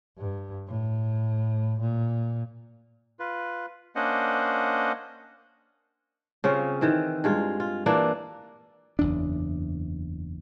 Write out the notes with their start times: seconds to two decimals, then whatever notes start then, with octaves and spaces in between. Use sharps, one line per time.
0.18 G2
0.68 A2
1.80 A#2
3.19 F4 B4
3.96 A#3 C#4 D4 C5 D#5 F#5
6.44 C#3 C4 C#4 F4
6.81 D#3 E3 C4
7.24 G2 G#3 F4
7.60 F4
7.86 E3 A#3 D4 F4
8.99 F#1 E2 D4